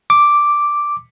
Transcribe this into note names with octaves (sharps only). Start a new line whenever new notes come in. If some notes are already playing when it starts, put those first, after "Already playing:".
D6